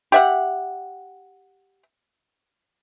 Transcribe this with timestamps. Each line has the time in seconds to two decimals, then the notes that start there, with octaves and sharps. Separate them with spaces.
0.12 G4 E5 F#5